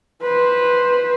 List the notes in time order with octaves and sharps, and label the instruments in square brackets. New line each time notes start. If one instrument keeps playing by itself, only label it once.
[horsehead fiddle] B4 C5